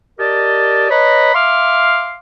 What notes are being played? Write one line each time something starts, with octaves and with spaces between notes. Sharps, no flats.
G4 A#4 D5 D#5 A5
B4 C#5 D#5 A#5 B5
E5 F5 C6 D6 F6